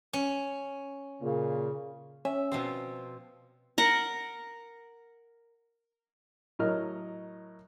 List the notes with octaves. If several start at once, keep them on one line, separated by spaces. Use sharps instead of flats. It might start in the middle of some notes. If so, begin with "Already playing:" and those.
C#4
A#2 C#3
C#4 E5
B2 F3 C4
A#4 F#5
A2 F#3 A#4 D#5 F6